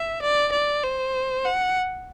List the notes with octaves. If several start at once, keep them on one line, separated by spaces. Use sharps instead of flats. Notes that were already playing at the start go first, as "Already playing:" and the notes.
Already playing: E5
D5
D5
C5
F#5